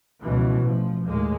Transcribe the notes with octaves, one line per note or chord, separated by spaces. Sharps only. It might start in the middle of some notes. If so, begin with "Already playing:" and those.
C#2 B2 E3 F3
A1 F3
D#2 A2 G#3 A#3